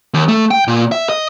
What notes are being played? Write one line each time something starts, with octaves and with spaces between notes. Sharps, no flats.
D#2
A3
G5
A#2
E5
D#5